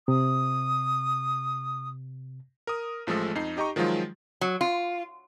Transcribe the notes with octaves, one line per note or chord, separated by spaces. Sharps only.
C3 D#6
A#4 D#6
A1 F3 G#3 A3 A4
F2 D#4 C7
D#4 G4 D#5 A#5 C#6
D#3 F3 F#3 G#3 F4
F#3
F4